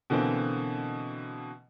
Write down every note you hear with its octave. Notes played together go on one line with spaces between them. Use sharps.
B2 D3 E3 A#3 C4